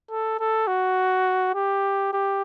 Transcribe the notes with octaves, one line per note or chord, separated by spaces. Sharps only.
A4
A4
F#4
G4
G4